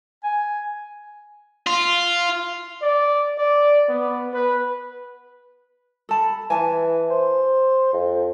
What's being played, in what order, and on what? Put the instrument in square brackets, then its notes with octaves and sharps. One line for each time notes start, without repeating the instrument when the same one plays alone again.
[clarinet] G#5
[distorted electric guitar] F4
[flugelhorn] D5
D5
B3
B4
[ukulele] A4 A5 B5
[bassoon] E3 [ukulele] G#5 A5
[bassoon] C5
F2